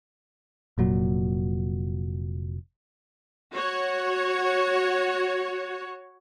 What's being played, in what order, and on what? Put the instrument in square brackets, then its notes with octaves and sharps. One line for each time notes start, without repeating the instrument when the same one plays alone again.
[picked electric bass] F1 A#2 F#3
[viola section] F#4 C#5